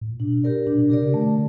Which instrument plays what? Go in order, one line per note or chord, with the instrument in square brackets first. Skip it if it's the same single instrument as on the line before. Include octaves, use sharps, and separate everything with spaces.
[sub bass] A2
A#2
[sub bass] B2 [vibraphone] D4
[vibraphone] G4 A#4 D5
[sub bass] A#2 [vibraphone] D4
[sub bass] B2
[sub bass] C3 [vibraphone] G4 A#4 D5
[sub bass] C#3
[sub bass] D3 [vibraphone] A3